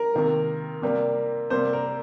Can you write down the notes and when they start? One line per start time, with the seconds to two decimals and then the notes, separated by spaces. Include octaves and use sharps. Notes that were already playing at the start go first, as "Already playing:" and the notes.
Already playing: A#4
0.14 C3 D#3 A#3
0.82 C3 G3 A#3
1.50 C3 G3 A#3 C5
1.73 A#4